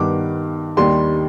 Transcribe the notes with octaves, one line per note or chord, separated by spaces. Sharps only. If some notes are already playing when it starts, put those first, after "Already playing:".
Already playing: G2 D#3 B3 D6
D#2 D#3 G3 D4 C6